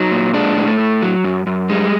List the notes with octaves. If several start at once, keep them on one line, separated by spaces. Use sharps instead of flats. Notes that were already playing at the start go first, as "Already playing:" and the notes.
Already playing: F#3 D#4
A#2
G#3 D4
A2 G#3
A3
A2
F#3
F#2
F#2
G3 G#3